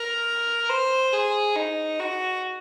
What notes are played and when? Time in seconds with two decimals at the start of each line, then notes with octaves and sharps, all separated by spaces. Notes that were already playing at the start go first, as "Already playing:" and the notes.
Already playing: A#4
0.69 C5
1.13 G#4
1.56 D#4
1.99 F#4